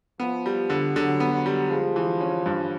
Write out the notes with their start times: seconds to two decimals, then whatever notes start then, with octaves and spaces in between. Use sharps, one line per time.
0.20 F3 B3
0.46 G3
0.70 D3
0.96 D3 F#3
1.20 B3
1.33 F#3
1.46 G3
1.70 F3 G#3
1.96 E3
2.21 C#4
2.46 G2